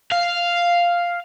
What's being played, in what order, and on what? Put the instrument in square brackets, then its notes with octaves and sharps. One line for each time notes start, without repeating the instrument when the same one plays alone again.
[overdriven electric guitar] F5